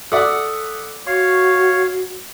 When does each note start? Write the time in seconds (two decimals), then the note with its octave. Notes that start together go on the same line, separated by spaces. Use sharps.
0.12 A4 D5 E5 F#5 D#6 E6
1.07 F#4 C#5 F5 C#6